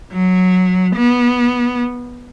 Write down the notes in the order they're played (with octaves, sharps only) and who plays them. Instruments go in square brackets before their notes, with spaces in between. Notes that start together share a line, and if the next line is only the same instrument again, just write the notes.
[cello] F#3
B3